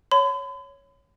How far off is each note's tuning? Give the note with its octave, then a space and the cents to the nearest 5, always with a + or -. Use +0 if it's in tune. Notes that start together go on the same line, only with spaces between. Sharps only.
C#5 +0 B5 +45